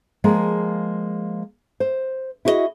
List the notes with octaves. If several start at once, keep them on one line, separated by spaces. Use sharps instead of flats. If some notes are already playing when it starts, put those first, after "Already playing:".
F3 G#3 A#3 G#4
C5
E4 F#4 G#4 B4 D#5